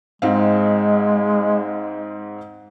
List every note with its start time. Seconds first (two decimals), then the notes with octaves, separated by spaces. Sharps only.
0.22 G#2 G#3 C4 F5